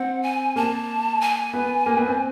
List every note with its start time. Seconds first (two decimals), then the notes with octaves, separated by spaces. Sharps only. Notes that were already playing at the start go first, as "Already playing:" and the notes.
Already playing: C4 F#5
0.23 G#5
0.56 A#3 A5
1.21 G#5
1.53 B3
1.86 A#3
1.97 B3
2.08 C4